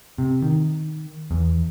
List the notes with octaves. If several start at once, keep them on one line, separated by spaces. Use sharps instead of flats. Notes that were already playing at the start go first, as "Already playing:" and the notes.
C3
D#3
E2